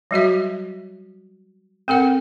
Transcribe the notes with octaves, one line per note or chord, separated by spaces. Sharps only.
F#3 G3 F#4 E5
C4 A4 A#4 F#5